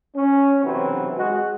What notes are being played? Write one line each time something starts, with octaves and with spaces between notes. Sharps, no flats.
C#4
B1 C3 E3 F#3 C4
G#3 F#4